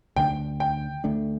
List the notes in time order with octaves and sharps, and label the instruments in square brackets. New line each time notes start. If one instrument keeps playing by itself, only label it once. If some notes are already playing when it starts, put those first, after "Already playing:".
[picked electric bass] D2 D3 A3 D4 [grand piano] G5
[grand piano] G5
[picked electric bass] D2 D3 A3 D4